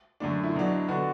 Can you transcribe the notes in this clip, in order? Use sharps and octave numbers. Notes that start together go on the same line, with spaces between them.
F#2 D3 A3 D4
E4
B2 F#3 D4
D3 B3 D4 F#4